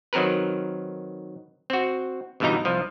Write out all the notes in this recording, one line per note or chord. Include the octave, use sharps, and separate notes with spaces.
D#3 F#3 C4 A#4 B4
C4 F#4
G1 G2 B2 E3 D#4 A#5
C2 F3